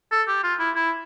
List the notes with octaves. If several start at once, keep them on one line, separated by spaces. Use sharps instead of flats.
A4
G4
F4
E4
E4